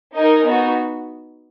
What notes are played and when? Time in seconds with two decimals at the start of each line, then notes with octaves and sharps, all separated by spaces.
0.16 D#4 A#4 D#5 G#5
0.45 B3 D#4 F#4